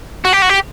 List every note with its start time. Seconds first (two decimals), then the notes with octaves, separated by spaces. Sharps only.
0.25 F#4
0.33 G4
0.42 F#4
0.49 G4